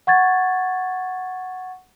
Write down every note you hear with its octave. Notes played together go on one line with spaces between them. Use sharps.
F#5 C#6 G#6 A6